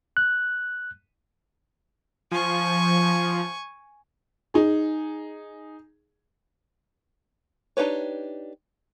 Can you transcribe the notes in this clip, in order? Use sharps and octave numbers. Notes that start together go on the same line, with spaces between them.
F#6
F3 G#5 C#6
D#4 G#4
D4 D#4 G4 B4 C#5